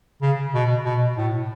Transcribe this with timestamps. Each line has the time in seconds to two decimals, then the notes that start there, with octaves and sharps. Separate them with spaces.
0.22 C#3
0.55 B2
0.85 B2
1.17 A2